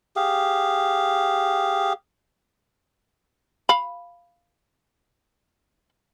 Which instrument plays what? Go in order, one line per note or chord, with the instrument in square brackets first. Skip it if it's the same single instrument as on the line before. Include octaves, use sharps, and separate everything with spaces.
[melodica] G4 G#4 F5
[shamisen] F5 B5